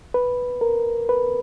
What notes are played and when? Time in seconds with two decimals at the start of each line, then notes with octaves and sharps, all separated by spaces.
0.14 B4
0.61 A#4
1.09 B4